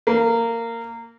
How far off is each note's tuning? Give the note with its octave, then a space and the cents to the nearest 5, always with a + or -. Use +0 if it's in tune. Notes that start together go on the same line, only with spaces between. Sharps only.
A#3 -15